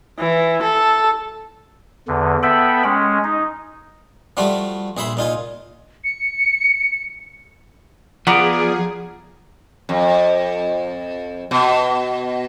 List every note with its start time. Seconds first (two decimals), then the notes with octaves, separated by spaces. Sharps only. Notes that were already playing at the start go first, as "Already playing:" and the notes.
0.19 E3
0.63 A4
2.08 E2 D3
2.43 B3 A4 E5 G5 B5
2.84 G#3 C#4
3.24 D#4
4.37 F3 G3 A3 F4 F#4
4.97 A#1 G#4 E5 B5 C6
5.17 A#2 D#4 F4 G#5
6.04 C#7
8.27 F3 B3 G#4 D5 F#5 A#5 D6
9.89 F2
11.51 B2